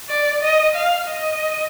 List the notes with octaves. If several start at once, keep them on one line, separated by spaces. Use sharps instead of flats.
D5
D#5
F5
D#5